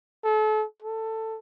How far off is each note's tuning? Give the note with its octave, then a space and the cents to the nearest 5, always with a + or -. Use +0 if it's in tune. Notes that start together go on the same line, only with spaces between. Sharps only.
A4 -35
A4 +15